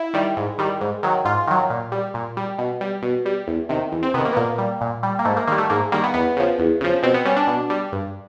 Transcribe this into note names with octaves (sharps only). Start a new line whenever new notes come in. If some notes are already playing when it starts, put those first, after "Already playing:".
Already playing: E4
D#3 G3
G#2
D#3 G3
G#2
D#3 F#3
G#2 F4
D#3 F#3
A#2
G3
A#2
G3
B2
G3
B2
G3
E2
C3 D#3
E2
C4
C3 D#3 B3
A#3
B3
A#2 A#3
G3
A#2
G3
A#3
G#2 A3
A#3
D#3 G3 A#3
A3
G#2 A#3
D#3 G3 A#3
B3
E2 B3
C#3 F3
E2
C#3 F3
B2 C4
B3
G3 C#4
D4
B2
G3
G2